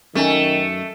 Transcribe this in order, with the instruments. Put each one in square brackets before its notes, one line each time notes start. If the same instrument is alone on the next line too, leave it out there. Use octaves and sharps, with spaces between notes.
[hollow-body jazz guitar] F#2 C#4 G#5 [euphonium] D#3 [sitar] A3